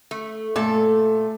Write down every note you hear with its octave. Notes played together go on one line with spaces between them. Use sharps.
A3
A#2 A3 A4